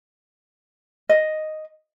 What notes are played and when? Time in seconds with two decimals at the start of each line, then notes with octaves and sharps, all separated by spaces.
1.09 D#5